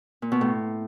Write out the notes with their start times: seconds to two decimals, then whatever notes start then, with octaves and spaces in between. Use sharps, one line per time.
0.22 A#2
0.32 B2
0.41 A2